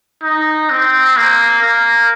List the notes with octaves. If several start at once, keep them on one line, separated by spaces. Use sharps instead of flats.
D#4
C4
A#3
A#3